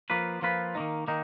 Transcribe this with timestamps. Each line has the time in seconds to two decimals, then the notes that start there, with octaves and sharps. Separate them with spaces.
0.10 F3 A#3 F4 B4
0.42 F3 A#3 F4 B4
0.75 D#3 A#3 D#4
1.08 D#3 A#3 D#4